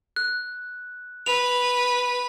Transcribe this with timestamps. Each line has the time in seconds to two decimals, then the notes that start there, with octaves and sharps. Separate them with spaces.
0.16 F#6
1.26 B4 F7